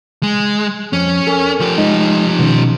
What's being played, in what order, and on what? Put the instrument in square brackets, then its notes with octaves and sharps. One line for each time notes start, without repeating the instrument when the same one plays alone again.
[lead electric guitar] G#3
[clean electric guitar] F2 [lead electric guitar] C#4
[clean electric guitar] A4 A#4 G#5
[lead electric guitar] F3 G4
[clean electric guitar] G#3 D#4 D#5
B2 D#3 C#4